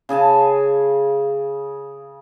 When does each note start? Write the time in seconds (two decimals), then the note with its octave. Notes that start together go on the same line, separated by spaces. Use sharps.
0.09 C#3 G#4 G#5 A5